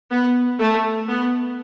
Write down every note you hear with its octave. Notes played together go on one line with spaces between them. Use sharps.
B3
A3
B3